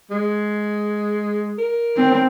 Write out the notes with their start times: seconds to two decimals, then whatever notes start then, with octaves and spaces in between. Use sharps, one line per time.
0.11 G#3
1.58 A#4
1.97 C4